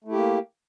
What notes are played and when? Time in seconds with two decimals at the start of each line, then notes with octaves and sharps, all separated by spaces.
0.04 A3
0.08 E4
0.12 G4
0.15 A#3